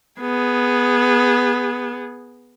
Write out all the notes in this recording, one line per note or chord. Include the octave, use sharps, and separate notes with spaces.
B3 G#4